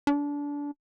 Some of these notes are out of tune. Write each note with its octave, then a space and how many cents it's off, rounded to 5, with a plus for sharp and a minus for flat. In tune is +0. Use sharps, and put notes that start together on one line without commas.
D4 -25